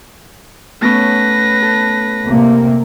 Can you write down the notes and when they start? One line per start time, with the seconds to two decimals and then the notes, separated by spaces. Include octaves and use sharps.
0.82 A3 B3 C#4 B4 A#6
1.62 A4
2.27 C3 A#3